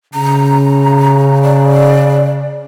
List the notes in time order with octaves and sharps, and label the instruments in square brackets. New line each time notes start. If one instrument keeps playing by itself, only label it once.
[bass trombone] C#3 [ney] A#5
[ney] D5